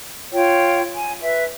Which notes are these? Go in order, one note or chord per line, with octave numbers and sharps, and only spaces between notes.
F4 C#5 G5
G#5
B4 E5